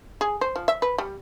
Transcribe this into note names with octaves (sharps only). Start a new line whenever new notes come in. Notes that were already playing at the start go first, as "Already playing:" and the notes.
G#4
C5
F3
E5
B4
G3